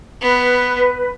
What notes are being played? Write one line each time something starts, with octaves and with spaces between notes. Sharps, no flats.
B3 B4